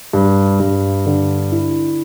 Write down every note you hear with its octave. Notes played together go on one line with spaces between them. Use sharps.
G2
G2
D3
E4